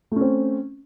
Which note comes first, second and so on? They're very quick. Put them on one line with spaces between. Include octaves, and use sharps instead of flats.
A3 C#4 C4